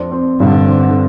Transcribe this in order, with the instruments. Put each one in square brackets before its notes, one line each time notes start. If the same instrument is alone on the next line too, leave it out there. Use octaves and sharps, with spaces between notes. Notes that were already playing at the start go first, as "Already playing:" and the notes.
Already playing: [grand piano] F2 C4 D4
C4
[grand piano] G2 [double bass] D3
[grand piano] C4